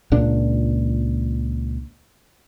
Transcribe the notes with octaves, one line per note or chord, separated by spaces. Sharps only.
C#2 A#2 D4